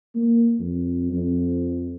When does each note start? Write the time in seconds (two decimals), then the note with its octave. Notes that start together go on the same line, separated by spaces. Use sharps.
0.15 A#3
0.59 F2
1.11 F2